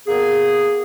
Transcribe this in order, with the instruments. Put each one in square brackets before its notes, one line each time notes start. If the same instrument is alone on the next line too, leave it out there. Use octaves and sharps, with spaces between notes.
[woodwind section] A#3 B3 G#4